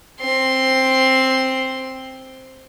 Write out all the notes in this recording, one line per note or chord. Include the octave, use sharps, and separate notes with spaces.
C4 C6